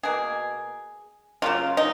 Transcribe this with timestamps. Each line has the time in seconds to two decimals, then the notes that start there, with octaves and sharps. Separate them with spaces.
0.03 B2 A#3 G#4
1.42 C#3 F#3 A#3 F4
1.77 D#4